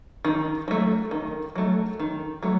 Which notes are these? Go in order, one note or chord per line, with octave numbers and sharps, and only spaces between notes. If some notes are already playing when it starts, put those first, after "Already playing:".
D#3
F#3 A3
D#3
F#3 A3
D#3
F#3 A3